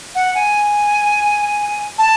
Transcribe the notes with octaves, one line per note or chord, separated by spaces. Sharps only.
F#5
G#5
A5